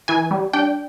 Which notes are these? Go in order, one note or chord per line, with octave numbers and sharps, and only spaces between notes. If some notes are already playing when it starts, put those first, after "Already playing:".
E3 G#5
G3
D4 G5